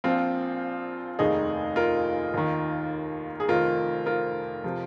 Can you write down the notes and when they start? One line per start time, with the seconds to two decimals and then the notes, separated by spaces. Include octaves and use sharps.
0.04 A#1 A#2 F3 C4 F4
1.19 F1 D#2 D#3 D#4 G#4
1.76 F4 A#4
2.34 D#2 D#3
3.40 G#4
3.48 F1 F2 D#3 F4 A#4
4.06 F4 A#4
4.64 C3 F3